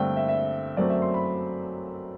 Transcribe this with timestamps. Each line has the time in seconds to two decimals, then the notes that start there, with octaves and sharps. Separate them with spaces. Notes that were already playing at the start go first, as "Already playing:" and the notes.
Already playing: G2 D3 A3 C4 G5
0.16 E5
0.28 E5
0.77 F#2 F#3 A3 C4 D5
0.89 E5
1.02 C6
1.14 B5